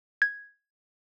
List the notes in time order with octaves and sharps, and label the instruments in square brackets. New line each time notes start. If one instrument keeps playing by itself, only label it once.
[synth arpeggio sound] G#6